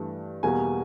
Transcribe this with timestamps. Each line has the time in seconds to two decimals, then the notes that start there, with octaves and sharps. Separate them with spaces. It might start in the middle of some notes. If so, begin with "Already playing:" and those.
Already playing: G2 E3 A3
0.43 E2 B2 G3 A#3 G#5